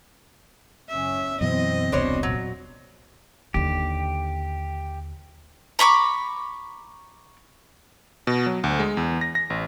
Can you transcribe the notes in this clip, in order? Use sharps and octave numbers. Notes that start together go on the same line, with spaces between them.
F#1 C#4 E5
F#2 B2 E3 C4 D#5
E1 C2 B2 D4 C5 C#5
A#2 F#3
D#2 D3 G4
A#5 B5 C#6 D6
B2
F#3
D2
G#3
E2
A#6
A#6
A1